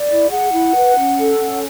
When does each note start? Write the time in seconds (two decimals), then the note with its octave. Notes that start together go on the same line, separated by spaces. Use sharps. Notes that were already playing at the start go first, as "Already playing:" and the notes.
Already playing: D5
0.09 E4
0.30 G#4 F#5
0.52 E4
0.75 B4
0.97 C#4
1.18 A4
1.40 C#4